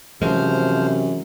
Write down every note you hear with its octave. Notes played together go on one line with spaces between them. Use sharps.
F#2 C3 E3 F3 G#3 C5 F6